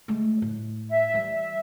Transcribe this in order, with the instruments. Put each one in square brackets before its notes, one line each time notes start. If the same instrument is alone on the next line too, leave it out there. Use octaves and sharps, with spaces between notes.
[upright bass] G#3 A3
A2
[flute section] E5
[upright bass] E3 G3
[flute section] E5